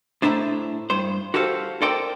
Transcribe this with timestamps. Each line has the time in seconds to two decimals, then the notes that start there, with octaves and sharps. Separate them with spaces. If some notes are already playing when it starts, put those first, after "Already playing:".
0.22 A2 D4 C5 E5 A#5
0.90 G2 C5
1.34 F#4 G4 A4 C5 F5
1.82 A4 A#4 C5 D5 G5